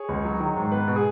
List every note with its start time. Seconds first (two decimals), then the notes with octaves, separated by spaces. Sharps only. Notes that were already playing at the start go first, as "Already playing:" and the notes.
Already playing: G#4 C#5
0.09 C#2
0.25 F#3
0.40 D#3
0.56 G#2
0.72 B3 B4
0.88 B2
0.96 G#4